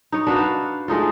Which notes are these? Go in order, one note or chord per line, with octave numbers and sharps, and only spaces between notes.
D#4 C#5
D4 F#4 B4 F5
G#3 A3 D#4 F4